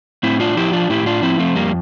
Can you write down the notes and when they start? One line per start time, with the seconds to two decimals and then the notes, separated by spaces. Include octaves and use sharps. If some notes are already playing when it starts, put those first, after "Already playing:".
0.23 A2 C4 E4
0.40 D4 F4
0.57 F3 E4 G4
0.73 D4 F4
0.90 A2 E4 G4
1.06 D4 F4
1.23 F3 C4 E4
1.39 A3 C4
1.56 F2 G3 A#3